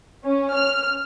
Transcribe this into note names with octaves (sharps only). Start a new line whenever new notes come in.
C#4
F6